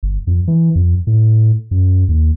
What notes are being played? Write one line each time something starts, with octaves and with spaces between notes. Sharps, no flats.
G1
F2
E3
F2
A2
F#2
D#2